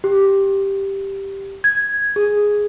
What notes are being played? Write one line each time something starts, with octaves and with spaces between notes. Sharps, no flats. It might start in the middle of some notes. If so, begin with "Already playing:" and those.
G4
G#6
G#4